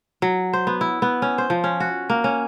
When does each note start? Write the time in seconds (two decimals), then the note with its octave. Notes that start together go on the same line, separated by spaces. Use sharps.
0.22 F#3
0.53 C5
0.67 B3
0.81 E4
1.02 B3
1.22 C#4
1.38 C5
1.50 F3
1.64 C#4
1.80 F#4
2.10 A#3
2.24 C#4